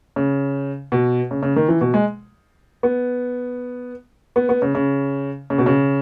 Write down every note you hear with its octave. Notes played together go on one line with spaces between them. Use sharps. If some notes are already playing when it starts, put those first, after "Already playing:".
C#3
B2
C#3
C#3
D#3
E3
B2
G#3
B3
B3
B3
C#3
C#3
C#3
B2
C#3